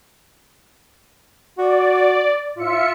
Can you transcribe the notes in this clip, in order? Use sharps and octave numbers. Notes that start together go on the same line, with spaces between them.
F#4 D5
A2 F4 E5 C#7